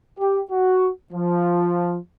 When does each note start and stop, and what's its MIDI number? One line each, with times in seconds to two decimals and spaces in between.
0.20 0.40 67
0.51 0.90 66
1.13 1.98 53